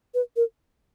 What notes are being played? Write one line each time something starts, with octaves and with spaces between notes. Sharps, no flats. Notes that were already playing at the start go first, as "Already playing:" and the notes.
B4
A#4